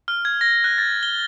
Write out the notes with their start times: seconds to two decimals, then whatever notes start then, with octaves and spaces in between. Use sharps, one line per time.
0.08 F6
0.25 G#6
0.41 A#6
0.64 F#6
0.78 A6
1.03 G7